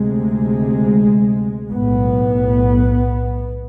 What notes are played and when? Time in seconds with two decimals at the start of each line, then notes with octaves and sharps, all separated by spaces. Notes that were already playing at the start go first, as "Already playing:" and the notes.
Already playing: D2 C3 G#3
1.72 B1 A2 B3